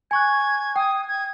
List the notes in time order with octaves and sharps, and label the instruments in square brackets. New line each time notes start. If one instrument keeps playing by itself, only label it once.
[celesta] G#5 C#6 F#6 [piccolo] G#6
[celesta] G5 [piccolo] D#6
[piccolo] G#6